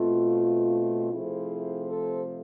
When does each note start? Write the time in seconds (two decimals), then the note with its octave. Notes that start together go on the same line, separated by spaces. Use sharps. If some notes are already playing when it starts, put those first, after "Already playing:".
Already playing: B2 A3 C4 F4
1.12 C3 F3 A3 C4 E4 G#4
1.89 A4 C5